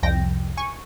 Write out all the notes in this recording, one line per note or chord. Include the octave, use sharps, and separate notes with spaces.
C2 F2 G5 A#6
G#5 C#6